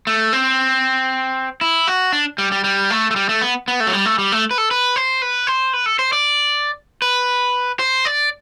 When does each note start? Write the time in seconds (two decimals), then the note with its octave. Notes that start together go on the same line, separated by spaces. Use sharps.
0.07 A3
0.33 C4
1.61 E4
1.87 F#4
2.13 D4
2.38 G3
2.52 G3
2.64 G3
2.90 A3
3.11 A3
3.16 G3
3.29 A3
3.41 B3
3.68 B3
3.80 A3
3.87 F#3
3.93 G3
4.06 A3
4.18 G3
4.32 A3
4.51 B4
4.58 A4
4.71 B4
4.96 C5
5.22 B4
5.47 C5
5.73 B4
5.86 A4
5.99 C5
6.13 D5
7.02 B4
7.79 C5
8.05 D5